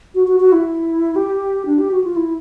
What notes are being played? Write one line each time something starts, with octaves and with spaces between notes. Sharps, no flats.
F#4
F#4
F#4
E4
G4
D4
G4
F#4
F4
E4